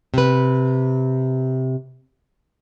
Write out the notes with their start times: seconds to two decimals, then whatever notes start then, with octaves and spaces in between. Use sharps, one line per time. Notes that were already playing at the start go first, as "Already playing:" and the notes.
0.14 C3 B4